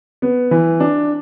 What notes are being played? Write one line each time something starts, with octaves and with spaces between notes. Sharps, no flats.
B3
E3
D4